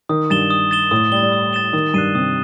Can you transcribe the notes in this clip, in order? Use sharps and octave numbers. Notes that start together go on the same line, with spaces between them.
D#3 D#6
G2 A6 E7 G7
D#6
A6 E7 G7
A2 D#6
G3 A6 E7 G7
G3
D#6
A6 E7 G7
D#3 D#6
G2 F#6 C7 D#7
C3 D#6